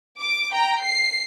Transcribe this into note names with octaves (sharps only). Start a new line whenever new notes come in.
D6
G5 A#5
C7